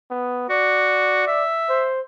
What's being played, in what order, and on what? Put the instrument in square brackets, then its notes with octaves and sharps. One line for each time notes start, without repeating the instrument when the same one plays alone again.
[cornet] B3
[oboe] F#4 [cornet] D5
[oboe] E5
[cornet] C5